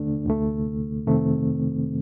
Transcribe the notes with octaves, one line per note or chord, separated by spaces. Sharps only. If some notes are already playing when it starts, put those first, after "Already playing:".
Already playing: D#2 D3 A3 D4
D2 D3 A3
F2 C3 D#3 A3 C4